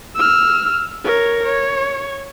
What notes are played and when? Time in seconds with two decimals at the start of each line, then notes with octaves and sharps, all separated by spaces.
0.16 E6 F6
1.05 A#4 C#5
1.45 C#5